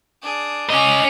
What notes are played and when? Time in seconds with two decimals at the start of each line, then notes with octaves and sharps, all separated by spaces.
0.23 D4 G#4
0.70 C#4 D#5 G#5 D6 F#6 F7